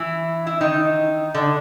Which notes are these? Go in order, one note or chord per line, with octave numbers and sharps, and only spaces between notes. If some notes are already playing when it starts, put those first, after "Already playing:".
Already playing: E3 E4
E4
D#3 D#4
D3 D4